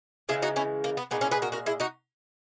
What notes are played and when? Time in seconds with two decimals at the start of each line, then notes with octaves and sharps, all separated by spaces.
0.29 C#3 E3 G#3 E4 G#4
0.42 D#4 F#4
0.56 C#4 E4
0.84 A#3
0.97 B3
1.11 A#2 G#3 B3 D#4
1.21 C#4 E4
1.31 G#4 B4
1.42 F#4 A#4
1.52 F#4 A#4
1.66 E4 G#4
1.80 D#4 F#4